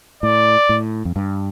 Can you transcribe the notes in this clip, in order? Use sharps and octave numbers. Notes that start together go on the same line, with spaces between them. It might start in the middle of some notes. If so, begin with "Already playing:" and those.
A2 D5
A2
F2
G2